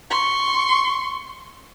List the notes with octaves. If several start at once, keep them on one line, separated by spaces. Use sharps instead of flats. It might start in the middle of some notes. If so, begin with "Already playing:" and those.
C6 C#6